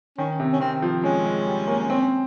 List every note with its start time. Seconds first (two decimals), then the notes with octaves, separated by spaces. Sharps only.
0.18 D#3 C#4
0.40 C3
0.53 C#4
0.60 D#3 C4
0.82 F3
1.03 G#3 C#4
1.25 G#3
1.47 G3
1.68 A#3
1.90 C4